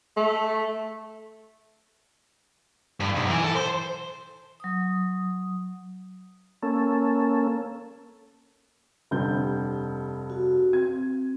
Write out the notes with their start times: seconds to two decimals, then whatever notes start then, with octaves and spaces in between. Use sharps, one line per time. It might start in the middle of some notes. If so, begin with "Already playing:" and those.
0.17 A3
3.00 G2
3.15 B1
3.30 E3
3.44 A4
3.56 C5
4.60 F#3 D#6
6.63 A#3 C#4 A4
9.11 F1 G2 G6
10.30 F#4
10.73 C4 G#6